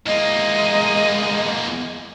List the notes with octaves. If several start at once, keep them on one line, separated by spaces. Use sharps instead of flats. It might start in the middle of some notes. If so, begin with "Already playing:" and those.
E2 G#3 A#3 D#5